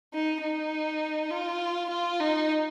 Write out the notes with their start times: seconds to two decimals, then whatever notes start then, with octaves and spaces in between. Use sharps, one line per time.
0.13 D#4
0.42 D#4
1.31 F4
1.90 F4
2.20 D#4